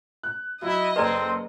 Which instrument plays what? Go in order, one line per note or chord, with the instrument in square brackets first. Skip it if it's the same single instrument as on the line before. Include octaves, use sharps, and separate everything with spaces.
[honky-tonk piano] F#6
[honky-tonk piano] F#3 [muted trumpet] E4 [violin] D#5
[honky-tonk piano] F#1 A4 C6 [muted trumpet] C4 [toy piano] B4 D5 A#5